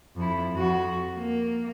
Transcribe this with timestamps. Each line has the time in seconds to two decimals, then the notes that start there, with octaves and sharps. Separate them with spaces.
0.16 F2 E4
0.53 F2 F#4
1.17 A#3